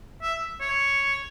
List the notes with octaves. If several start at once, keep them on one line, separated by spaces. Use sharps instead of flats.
E5
C#5